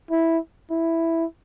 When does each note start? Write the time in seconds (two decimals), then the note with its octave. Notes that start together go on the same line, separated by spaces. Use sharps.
0.11 E4
0.71 E4